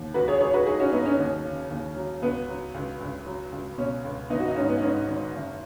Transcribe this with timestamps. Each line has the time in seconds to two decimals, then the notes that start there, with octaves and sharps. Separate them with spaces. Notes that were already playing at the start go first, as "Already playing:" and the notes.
Already playing: D#2
0.14 C#2 F#4 B4
0.28 G#4 C#5
0.40 F#3 G#4 C#5
0.53 F#4 B4
0.66 F#3 D#4 G#4
0.80 C#4 F#4
0.92 F#3 B3 D#4
1.06 C#4
1.19 D#2
1.45 C#3
1.70 D#2
1.96 F#3
2.22 C#2 B3
2.48 F#3
2.74 C#2
3.01 C#2
3.26 F#3
3.52 C#2
3.78 B2 C#4
4.04 C#2
4.30 G#1 B3 D#4
4.40 F#4
4.48 D#4
4.56 G#2 C#4
4.69 B3
4.78 D#4
4.82 G#2 C#4
5.08 G#1
5.34 F#1